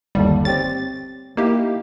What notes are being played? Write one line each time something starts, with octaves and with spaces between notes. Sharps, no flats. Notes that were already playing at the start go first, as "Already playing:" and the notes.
G1 D#2 G3 A4
C4 G4 C#5 A6
A#3 D#4 E4 G4